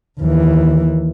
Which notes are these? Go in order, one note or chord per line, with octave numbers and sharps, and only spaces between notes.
D#2 E3